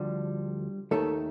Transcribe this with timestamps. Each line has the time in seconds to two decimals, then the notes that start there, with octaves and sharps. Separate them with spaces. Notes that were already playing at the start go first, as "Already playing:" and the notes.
Already playing: D2 D3 F3 G3 G4
0.91 D#2 D#3 A3 A4